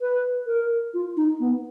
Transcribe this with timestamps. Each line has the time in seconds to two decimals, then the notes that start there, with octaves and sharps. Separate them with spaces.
0.01 B4
0.47 A#4
0.94 F4
1.17 D#4
1.40 B3